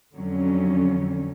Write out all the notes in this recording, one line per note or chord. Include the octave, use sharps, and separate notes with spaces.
F2 D3 F#3 C#4